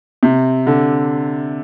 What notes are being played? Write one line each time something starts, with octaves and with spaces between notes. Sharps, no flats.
C3
D3